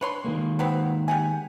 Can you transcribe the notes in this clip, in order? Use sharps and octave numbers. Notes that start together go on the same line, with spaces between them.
D4 B4 C#5 C6
D#3 G#3 A#3
F#3 B3 C4
G4 F#5 G#5